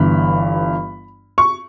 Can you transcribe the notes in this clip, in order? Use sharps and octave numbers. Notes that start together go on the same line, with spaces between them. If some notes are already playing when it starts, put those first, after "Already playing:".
Already playing: G1 G2 E3 B5
C#6